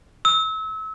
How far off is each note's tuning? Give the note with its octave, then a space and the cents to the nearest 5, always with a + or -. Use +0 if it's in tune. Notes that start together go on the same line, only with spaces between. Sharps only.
E6 -30